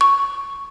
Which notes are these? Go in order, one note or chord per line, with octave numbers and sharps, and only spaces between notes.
C#6